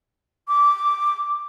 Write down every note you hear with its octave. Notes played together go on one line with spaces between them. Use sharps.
D6